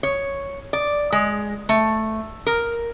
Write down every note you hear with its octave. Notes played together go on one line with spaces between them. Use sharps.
C#5
D5
G#3
A3
A#4